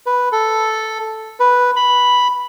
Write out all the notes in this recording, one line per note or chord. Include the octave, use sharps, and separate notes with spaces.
B4
A4
B4
B5